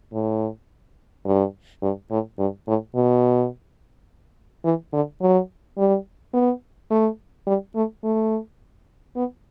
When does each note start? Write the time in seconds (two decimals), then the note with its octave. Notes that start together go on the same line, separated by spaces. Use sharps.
0.13 A2
1.26 G2
1.82 G2
2.11 A2
2.39 G2
2.67 A2
2.95 B2
4.64 E3
4.93 D3
5.21 F#3
5.78 G3
6.34 B3
6.90 A3
7.47 G3
7.75 A3
8.04 A3
9.16 B3